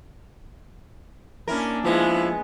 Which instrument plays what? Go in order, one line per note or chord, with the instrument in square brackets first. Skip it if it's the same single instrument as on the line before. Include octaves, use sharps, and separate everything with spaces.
[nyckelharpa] A#3 D4 [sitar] C#4 E4 A#4
[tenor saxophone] F3 [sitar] G#3 B3 [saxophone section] E4